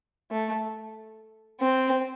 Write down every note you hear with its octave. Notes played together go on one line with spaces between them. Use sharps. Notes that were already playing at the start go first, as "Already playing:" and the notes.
A3
C4